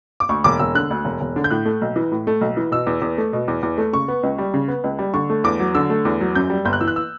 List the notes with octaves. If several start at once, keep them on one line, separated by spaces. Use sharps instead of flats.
D6
D2 C#6
E1 D6
E1 E6
D3 F#6
D2
E1
E1
D3
G6
A2 F#6
A3
B1
E3
A2
A3
B1
E3
B2 E6
E2
E2
A3
B2
E2
E2
A3
C#3 C#6
B3
C#2
G3
C#3
B3
C#2
G3
D3 C#6
A3
E2 D6
F#3
D3 E6
A3
E2
F#3
F#2 G6
G3
G1 G6
F#6
E3 E6
F#6
E6